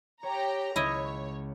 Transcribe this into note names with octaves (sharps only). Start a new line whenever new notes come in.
G4 C#5 A#5
C#2 E4 C#5 D#5